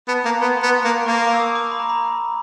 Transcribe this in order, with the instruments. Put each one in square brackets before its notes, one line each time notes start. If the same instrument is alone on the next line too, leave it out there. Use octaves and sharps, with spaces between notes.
[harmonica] B3 [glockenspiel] A5
[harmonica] A#3 [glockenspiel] A#5
[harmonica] B3 [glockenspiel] C6
[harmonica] B3
A#3
[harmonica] A#3 [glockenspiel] C#6
[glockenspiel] D6
E6
D#6
D6
B5
A#5
B5